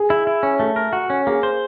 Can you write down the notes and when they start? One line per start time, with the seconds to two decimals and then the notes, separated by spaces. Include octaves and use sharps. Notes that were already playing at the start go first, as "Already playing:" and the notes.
Already playing: G#4
0.10 E4
0.27 E4
0.43 C#4
0.60 A3 A4
0.76 A#4
0.93 F#4
1.10 C#4
1.26 A#3 G#4
1.43 C5